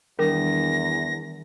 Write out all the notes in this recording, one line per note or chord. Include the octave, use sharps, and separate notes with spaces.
E2 D#3 G3 D4 A#4 A#6